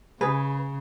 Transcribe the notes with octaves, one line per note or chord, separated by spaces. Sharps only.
C#3 G#4 B4